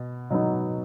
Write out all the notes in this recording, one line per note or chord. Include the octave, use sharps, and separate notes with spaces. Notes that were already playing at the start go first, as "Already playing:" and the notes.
Already playing: B2
B2 F#3 B3 D#4